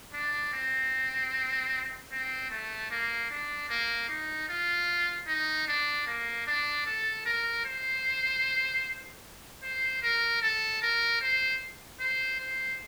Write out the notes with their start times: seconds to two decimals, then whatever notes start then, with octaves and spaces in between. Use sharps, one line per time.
0.13 D4
0.53 C4
2.12 C4
2.51 A3
2.91 A#3
3.30 D4
3.69 A#3
4.09 D#4
4.49 F4
5.28 D#4
5.67 D4
6.07 A#3
6.46 D4
6.86 A4
7.25 A#4
7.65 C5
9.63 C5
10.02 A#4
10.42 A4
10.82 A#4
11.21 C5
12.00 C5
12.40 C5